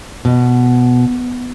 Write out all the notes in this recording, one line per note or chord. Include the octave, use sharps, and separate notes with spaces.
B2